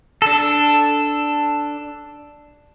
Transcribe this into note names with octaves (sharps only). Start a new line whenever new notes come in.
D4 A4